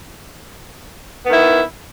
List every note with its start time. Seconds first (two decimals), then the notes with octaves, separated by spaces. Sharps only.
1.26 B3
1.29 D#3
1.32 E4